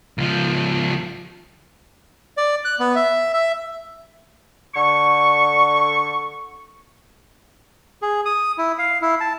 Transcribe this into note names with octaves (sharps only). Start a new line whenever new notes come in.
C#2 F3
D5
F#6
B3
E5
E5
D3 C#6
G#4
D#6
E4
F5
E4
A5